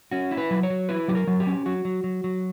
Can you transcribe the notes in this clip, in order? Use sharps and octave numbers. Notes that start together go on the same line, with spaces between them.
C#4 F#4
E4
B4
F#3
C#5
F#3
E4 B4
F#3 G4
A#4
F#3
G4
C#4
F#3 F#4
F#3
F#3
F#3